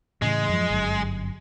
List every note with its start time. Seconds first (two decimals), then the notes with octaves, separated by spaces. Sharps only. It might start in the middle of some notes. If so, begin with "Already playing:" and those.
0.22 A2 C#3 E3 G#3
0.49 F#2 F3
0.70 G1 F#2